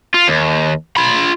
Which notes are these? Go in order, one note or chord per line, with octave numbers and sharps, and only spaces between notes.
F4
D#2
F4 B5